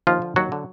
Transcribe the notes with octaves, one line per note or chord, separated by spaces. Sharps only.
D#2 F3 F4
D3
D#2 F#3 F#4
D3